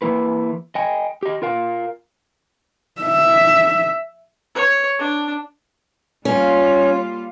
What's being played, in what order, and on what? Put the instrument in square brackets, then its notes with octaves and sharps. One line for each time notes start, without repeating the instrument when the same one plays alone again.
[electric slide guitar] E3 A#3 E4 B4
D#5 G5 G#5
G4 D#5
F4 A#4 F5
[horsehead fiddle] E5
[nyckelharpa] C#5
D4
[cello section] G3 A#3 F4 [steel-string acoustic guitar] C#4